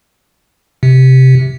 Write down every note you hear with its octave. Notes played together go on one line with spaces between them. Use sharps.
C3